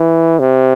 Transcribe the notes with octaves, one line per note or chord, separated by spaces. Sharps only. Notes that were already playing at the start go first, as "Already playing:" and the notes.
Already playing: E3
C3